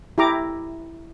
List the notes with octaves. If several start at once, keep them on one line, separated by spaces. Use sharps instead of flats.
E4 G4 A#5 D6